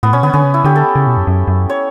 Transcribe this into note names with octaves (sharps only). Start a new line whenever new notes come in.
A2 B3
B2 C#4
D3 B3
D3 C#4
C#3
E4
D3 G4
A4
C#3
B2
F#2
F#2
F#2
C#5